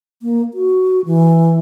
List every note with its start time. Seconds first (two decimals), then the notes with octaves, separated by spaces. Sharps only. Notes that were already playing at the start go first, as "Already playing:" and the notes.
0.22 A#3
0.54 F#4
1.06 E3